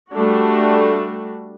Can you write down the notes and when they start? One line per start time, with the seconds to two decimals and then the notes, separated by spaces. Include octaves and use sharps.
0.11 G3 A3 D4 F#4